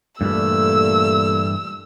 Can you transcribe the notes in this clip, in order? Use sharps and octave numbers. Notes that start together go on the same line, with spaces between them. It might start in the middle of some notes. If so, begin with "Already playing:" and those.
G2 A#2 E3 G3 A3 E6